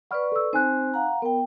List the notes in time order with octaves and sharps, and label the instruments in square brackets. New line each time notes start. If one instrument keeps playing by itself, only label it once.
[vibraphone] B4 D5 C#6 [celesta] F#5 B5 F6
[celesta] A4 E6
[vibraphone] C4 C5 [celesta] D#4 G#5 F#6
[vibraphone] F5 F#5 A#5
[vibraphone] B3 G5 [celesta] A#4